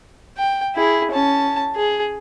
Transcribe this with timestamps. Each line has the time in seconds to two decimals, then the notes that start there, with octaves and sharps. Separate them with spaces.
0.37 G5
0.76 E4 G#4
1.12 C#4 A5
1.76 G#4